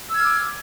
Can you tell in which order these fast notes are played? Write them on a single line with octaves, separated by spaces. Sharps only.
E6 G#6 F6 D6